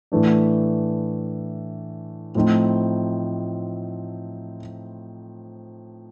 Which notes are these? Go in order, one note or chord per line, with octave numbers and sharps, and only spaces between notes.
A2 E3 A3 D4
A2 F3 A3 C4 D#4